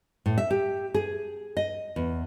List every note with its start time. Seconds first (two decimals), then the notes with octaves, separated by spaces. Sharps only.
0.26 A2
0.38 E5
0.50 G4
0.94 G#4
1.57 D#5
1.96 E2